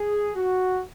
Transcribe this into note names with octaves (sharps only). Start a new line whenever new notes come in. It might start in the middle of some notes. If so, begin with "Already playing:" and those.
Already playing: G#4
F#4